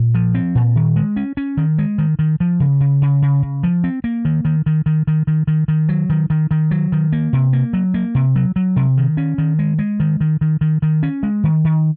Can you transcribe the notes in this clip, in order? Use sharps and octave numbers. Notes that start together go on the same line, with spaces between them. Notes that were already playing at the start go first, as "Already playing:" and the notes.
Already playing: A#2
F3
C4
A#2
D#3
G#3
C#4
C#4
D#3
G#3
D#3
D#3
F3
C#3
C#3
C#3
C#3
C#3
F3
C4
A#3
D#3
D#3
D#3
D#3
D#3
D#3
D#3
D#3
F#3
D#3
D#3
D#3
F#3
D#3
A#3
C3
A#3
F#3
A#3
C3
F#3
F#3
C3
D#3
C#4
D#3
G#3
G#3
D#3
D#3
D#3
D#3
D#3
C#4
G#3
D#3
D#3